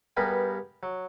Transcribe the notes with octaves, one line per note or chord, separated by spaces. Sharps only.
G2 G3 B3 G#4 A#4 B5
F#3